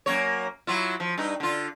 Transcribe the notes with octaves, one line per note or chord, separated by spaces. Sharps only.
F#2 A#3 C#5
F#3 E4 F4
F3
G2 D#4
D3 F4